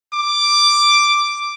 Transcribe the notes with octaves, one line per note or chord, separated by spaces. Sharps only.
D6